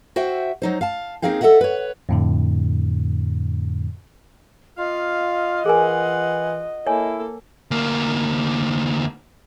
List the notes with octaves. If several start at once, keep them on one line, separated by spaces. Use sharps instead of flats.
F#4 C5 E5 G5
F#3 D#4 C5
F5 A5
A#3 C4 D#4 G#4 F5 G5
A4 B4 D#5 E5 F#5
B4 C#5
F2 A2 D3
F4 D#5 F5
E3 F4 G#4 A#4 F#5 G#5
A#3 E4 A4 C#5 G#5
D2 A#3